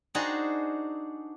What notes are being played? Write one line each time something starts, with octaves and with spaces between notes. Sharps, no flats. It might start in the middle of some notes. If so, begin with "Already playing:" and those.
D4 D#4 F#4 G#4 C5